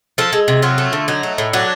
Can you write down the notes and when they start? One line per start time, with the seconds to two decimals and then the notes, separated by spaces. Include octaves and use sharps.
0.18 F3 A4
0.33 G#3
0.48 C3
0.62 F#3 F4
0.78 A3
0.93 D3
1.08 F#3 D#4
1.23 A3
1.38 A2
1.53 F#3 D4